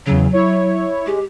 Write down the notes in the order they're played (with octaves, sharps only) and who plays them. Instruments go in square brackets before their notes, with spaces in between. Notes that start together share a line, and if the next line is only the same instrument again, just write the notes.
[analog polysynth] E2 C#3 [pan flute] F#3
[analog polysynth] E4 C#5
[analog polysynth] G#3 [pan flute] G4